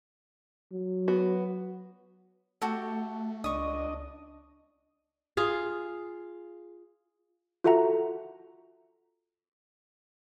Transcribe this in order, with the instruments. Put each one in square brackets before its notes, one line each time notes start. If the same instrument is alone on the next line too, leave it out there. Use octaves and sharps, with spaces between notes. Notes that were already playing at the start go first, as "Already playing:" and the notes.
[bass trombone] F#3
[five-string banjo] B3 F#4
[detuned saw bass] A3 [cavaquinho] F#4 G4 A4
[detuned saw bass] C#2 [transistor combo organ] D4 D#5 [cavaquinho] C#6 D#6
[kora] F4 G#4 F5
[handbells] F4 F#4 A4 E5 F#5 A#5